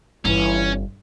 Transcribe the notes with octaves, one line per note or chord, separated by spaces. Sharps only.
G1 E3 C#4